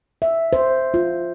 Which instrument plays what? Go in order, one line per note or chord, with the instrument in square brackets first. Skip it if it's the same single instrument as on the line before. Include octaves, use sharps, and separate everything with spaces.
[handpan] E5
C5
F4